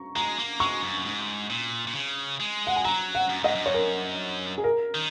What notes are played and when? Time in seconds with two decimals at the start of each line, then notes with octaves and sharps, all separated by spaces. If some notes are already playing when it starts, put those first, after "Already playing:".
Already playing: A#5 C#6
0.16 G#3 A#5
0.39 A#3
0.60 G#3 C#6
0.83 F#2
1.06 G#2
1.50 A#2
1.87 A#2
1.95 C#3
2.40 G#3
2.67 F#5
2.76 G#5
2.85 F#3 A#5
3.15 F#5
3.29 F#2
3.43 G#2 D#5
3.55 F#2
3.66 C#5
3.74 A#4
4.58 G#4
4.64 A#4
4.95 D#3